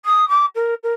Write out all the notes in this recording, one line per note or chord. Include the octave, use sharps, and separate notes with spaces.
D#6
D6
A#4
A#4